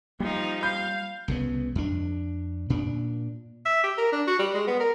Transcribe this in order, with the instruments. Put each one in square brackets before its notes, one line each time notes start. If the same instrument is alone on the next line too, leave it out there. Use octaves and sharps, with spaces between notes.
[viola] F3 D#4 [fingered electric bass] G3 [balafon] A#3
[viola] F5 [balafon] B5 [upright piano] G6
[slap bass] C2 C#3 B3
F2 D4
A#2 D4
[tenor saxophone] E5
G4
A#4
D4
F#4
G3
G#3
B3
A#4